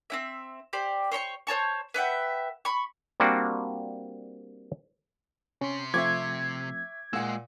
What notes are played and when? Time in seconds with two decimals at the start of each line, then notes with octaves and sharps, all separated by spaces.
0.10 C4 C#4 E5
0.73 G4 C5 D5
1.12 C5 C#5 B5 C#6
1.47 C5 C#5 A5 C#6
1.94 B4 E5 F#5 G5
2.65 B5 C#6
3.20 G3 A#3 C4 D4 F#4
5.61 C3 C#4 C6
5.94 F3 A3 C4 E5 C#6 D6 G#6
7.13 A#2 G#3 F#5 E6